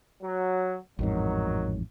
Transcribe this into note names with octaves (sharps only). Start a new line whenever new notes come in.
F#3
A1 F2 G#2 D#3 F#3